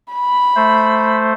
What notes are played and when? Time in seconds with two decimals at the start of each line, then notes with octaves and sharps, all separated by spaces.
0.13 B5
0.56 A3 C5